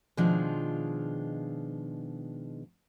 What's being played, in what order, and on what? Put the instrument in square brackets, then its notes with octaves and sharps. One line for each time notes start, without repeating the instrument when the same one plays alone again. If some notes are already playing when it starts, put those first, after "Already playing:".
[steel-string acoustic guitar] B2 D#3 F3 G#3 D4 F4